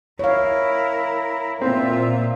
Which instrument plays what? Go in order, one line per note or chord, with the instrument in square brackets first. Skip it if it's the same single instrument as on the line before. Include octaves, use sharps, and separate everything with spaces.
[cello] E4 A#4 [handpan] C#5 F5
[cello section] A#2 [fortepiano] C4 [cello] F4 E5